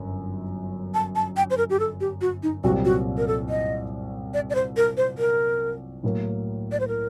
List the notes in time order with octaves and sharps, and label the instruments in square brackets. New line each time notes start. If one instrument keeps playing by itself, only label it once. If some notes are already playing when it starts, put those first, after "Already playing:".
Already playing: [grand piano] G1 F#2 F#3
[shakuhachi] A5
A5
G5
C5
A#4
G4
A4
G4
F#4
D#4
[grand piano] C2 A#2 F#3 C4 G4 [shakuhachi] F#4
[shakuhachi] F#4
A#4
A4
D#5
D5
D5
C5
A#4
C5
A#4
[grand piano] A2 F#3 A#3
[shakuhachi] D5
C5
A#4